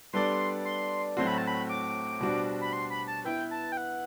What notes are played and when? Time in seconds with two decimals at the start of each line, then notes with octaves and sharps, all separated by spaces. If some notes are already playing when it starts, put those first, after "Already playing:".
0.13 G3 B3 D4 A4 D5 C6
0.65 C6
1.17 A2 F#3 A3 C4 F#4 C6
1.27 B5
1.38 A5
1.47 B5
1.69 D6
2.20 B2 G3 D4 F#4 C5
2.61 B5
2.73 C6
2.90 B5
3.08 A5
3.24 B3 E4 B4 G5
3.51 A5
3.72 G5
3.77 F#5